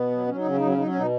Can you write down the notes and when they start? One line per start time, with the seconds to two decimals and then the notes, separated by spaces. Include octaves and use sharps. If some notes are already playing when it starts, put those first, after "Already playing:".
Already playing: B2 B3
0.11 F#3
0.27 F#3 C#4
0.37 D#4
0.44 C#3 C#4
0.57 F#3 D#4
0.67 C#4
0.77 F#3 D#4
0.87 C#4
0.95 B2 D#4